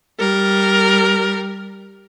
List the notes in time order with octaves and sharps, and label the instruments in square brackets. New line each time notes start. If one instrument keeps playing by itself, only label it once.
[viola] G3 A#4